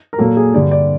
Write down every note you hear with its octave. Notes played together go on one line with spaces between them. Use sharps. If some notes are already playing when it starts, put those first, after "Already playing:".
A#4
A#2 F#3 A#3 A4
G#4
G2 D3 G3 D5
D5